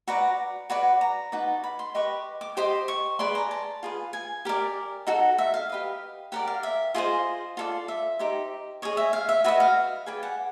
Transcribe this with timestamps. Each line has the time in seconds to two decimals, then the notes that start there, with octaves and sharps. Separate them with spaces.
0.08 F#4 B4 D5 A#5
0.70 F#4 B4 D5
1.01 A#5
1.32 D#4 F#4 B4 D5
1.64 B5
1.79 C6
1.95 G4 B4 D#5 C#6
2.41 D6
2.57 G4 C5 D#5
2.88 C#6
3.19 G#4 B4 D5 C6
3.35 A#5
3.51 A5
3.83 F4 G#4 B4
4.13 G#5
4.45 G4 A#4 D5
5.07 D#4 F#4 A4
5.38 E5
5.54 F5
5.69 G4 B4 D#5
6.32 G4 A#4 D5 F#5
6.47 F5
6.63 E5
6.94 F4 G#4 C5 D#5
7.57 F4 A4 D5
7.88 E5
8.19 D#4 G4 C5
8.82 G#4 C#5 D#5
8.97 E5
9.13 F5
9.29 E5
9.44 F#4 B4 D#5 E5
9.60 F5
10.06 G#4 B4 D5 G5
10.23 F#5